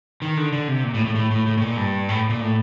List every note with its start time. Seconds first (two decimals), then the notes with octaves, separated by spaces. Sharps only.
0.22 D#3
0.37 D3
0.52 D3
0.68 C3
0.84 A#2
0.94 A2
1.05 A2
1.15 A2
1.31 A2
1.46 A2
1.57 A2
1.62 A#2
1.77 G2
2.09 A2
2.29 A#2
2.40 A2